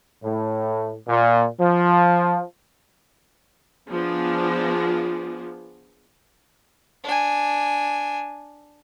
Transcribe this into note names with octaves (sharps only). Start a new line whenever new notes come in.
A2
A#2
F3
F3 B3 D4 F4 G#4
D4 G#5